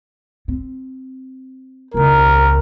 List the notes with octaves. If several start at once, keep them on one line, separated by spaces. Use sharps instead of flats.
C4
E1 C#2 A#4